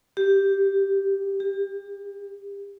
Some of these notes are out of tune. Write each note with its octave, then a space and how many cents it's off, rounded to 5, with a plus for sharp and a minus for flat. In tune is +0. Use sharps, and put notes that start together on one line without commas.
G4 +0
G4 +35